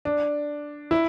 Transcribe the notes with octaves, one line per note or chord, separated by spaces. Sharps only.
D4
E4